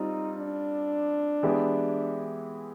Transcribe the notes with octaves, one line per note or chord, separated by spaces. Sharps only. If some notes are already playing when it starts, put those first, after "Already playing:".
Already playing: G3 C4 D#4 F4
D4
E3 G#3 B3 E4 G4